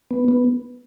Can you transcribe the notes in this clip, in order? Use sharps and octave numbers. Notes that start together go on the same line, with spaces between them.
B3
B3